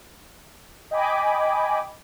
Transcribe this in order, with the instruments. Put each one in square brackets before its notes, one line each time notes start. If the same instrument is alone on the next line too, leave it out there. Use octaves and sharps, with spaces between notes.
[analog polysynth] D#5 G5 G#5 B5 D6